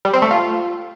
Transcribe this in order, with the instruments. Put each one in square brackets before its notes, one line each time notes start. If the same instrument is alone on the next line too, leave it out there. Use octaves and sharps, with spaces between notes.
[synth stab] G3
C4
A3
F4